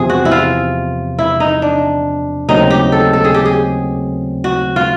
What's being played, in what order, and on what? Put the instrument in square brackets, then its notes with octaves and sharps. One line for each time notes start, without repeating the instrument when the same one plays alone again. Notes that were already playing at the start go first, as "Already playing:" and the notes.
Already playing: [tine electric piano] E2 C3 F3 [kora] G#4
[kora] F#4
E4
F4
E4
D#4
D4
[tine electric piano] D#2 C#3 F#3 A3 C4 [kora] D#4
[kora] G4
A4
A4
G#4
G4
G#4
F#4
F4